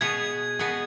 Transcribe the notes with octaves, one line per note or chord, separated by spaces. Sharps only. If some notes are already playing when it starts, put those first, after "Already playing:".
B2 B3 G#4 G#6
B2 B3 G#4